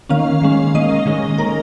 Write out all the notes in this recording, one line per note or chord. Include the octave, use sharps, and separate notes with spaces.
D#3 A#3 C#4 F5
D#3 G#3 C#4
D#3 A#3 C#4 D#5
D#3 G#3 C#4
D#3 A#3 C#4 A#4